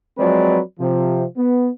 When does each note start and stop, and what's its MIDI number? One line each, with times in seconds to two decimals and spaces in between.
0.18 0.59 53
0.18 0.59 54
0.18 0.59 56
0.18 0.59 60
0.18 0.59 71
0.18 0.59 74
0.79 1.24 48
0.79 1.24 53
1.37 1.69 59